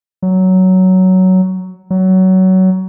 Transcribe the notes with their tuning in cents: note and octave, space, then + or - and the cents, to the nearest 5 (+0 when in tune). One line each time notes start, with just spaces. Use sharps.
F#3 +10
F#3 +20